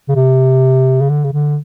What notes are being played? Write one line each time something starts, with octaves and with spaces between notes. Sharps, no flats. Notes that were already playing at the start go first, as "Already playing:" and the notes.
C#3
C3
C#3
D3
C#3
D3